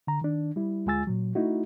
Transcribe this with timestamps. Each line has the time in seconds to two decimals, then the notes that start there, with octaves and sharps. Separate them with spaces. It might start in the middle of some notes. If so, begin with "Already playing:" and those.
0.07 D3 A#5
0.21 D#3 D4
0.56 G3 E4
0.86 D2 G#3 F4 G#5 E6 A6
1.07 A#2 F#3
1.35 A3 D#4 E4 F#4